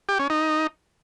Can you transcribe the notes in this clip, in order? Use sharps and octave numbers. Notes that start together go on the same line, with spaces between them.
G4
C#4
D#4